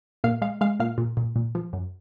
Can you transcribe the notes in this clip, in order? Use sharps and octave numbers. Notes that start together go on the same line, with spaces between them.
A#2 F5
G#3 F5
G#3 F5
A#2 F5
A#2
A#2
A#2
F3
F#2